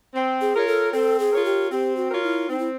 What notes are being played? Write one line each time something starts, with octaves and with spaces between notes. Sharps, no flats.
C4
G#4
F4 A#4 C#5
A4
C4 A4
G#4
F4 A#4 C#5
G4
C4 G4
F#4
F4 A#4 C#5
E4
C4 D#4
E4